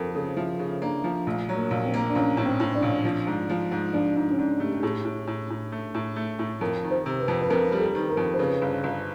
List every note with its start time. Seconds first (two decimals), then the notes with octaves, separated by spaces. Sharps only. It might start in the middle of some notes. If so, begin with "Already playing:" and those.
Already playing: F2 A4 A#4 C5
0.15 C#3 A4
0.37 F3 E4
0.59 C#3
0.82 A#3 D4
1.04 F3
1.26 A#1 A3
1.49 F#3
1.56 A#3
1.71 A#1
1.85 C4
1.94 A#3
2.09 D4
2.15 A#1 C#4
2.37 A2 C#4
2.45 C4
2.60 A2
2.75 D4
2.82 A#1
3.05 F3
3.27 G#2
3.50 F3
3.71 G#2
3.93 F3 D4
4.15 G#2 D#4
4.30 C#4
4.38 G#2 D4
4.60 A3 G4
4.74 G4
4.83 A2 G#4
5.05 A2
5.27 A2
5.50 A2
5.72 A3
5.95 A2
6.16 A3
6.39 A2
6.61 F2 A#4
6.84 D#3
6.91 C5
7.06 C3
7.21 B4
7.28 F2
7.42 B4
7.50 F2 A#4
7.72 G3
7.80 A4
7.95 D#3
8.10 A#4
8.17 F2
8.34 C5
8.39 C#3 B4
8.62 G1
8.84 G1